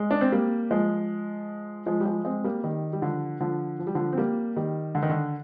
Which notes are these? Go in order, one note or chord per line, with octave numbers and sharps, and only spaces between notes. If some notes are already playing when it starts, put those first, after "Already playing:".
Already playing: G#3
D4
C4
G3 A#3
F3 G#3
F3 G#3
G3
F3 G#3
G#3 C4
G3 A#3
D#3 G3
G3
D3 F3
D3 F3
F3
G3
D3 F3
C4
G3 A#3
D#3 G3
D3
D#3
D3